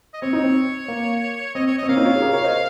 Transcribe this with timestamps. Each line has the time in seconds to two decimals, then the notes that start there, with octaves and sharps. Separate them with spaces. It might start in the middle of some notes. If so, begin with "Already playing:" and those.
0.13 D#5
0.22 C4 C#5
0.33 C4 D#4
0.44 C4
0.88 A#3
1.55 C4 D#5
1.67 C#5
1.78 C4 D#5
1.89 A#3 C#4 F5
1.97 C4 D#4
2.05 C#4 F4
2.15 G#4
2.22 G4 A#4
2.33 A#4 C#5
2.44 C5 D#5